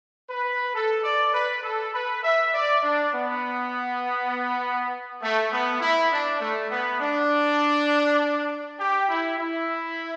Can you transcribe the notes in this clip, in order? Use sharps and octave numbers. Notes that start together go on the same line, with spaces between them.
B4
A4
D5
B4
A4
B4
E5
D5
D4
B3
A3
B3
E4
D4
A3
B3
D4
G4
E4
E4